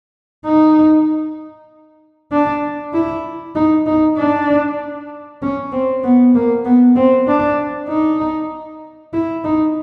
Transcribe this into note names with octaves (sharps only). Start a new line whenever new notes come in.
D#4
D4
E4
D#4
D#4
D4
C#4
C4
B3
A#3
B3
C4
D4
D#4
E4
D#4